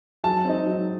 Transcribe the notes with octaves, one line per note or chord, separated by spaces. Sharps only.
F#3 A5
C4 D#4
F#3